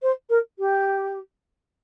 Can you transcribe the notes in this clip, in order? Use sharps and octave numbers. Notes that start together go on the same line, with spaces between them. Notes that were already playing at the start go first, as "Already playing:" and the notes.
C5
A#4
G4